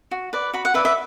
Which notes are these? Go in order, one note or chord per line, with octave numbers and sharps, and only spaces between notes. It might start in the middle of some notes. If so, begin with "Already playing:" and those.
F#4
B4 D5
F#4 B5
F#5
B4 D5 E5
E5